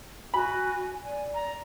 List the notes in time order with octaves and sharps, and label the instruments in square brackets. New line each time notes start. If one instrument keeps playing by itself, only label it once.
[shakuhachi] F#4 [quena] G#5 [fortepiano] B5
[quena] D5 [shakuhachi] G#5
[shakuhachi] A#5